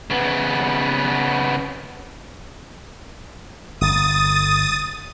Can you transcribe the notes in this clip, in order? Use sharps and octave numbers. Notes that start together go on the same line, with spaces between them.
C#3 B3
G1 D#6 A6